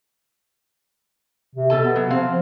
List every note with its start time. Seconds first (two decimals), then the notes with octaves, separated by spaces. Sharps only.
1.55 C3
1.70 B2 A4 A5
1.81 B3
1.96 F#3
2.10 F3 C4 F5